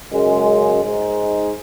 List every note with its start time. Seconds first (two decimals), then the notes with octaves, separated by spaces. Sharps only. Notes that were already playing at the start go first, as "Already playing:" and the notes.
0.11 F#2 C#3 G#3
0.82 G#2 G#3 D#4